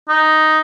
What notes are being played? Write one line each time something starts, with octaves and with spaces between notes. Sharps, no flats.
D#4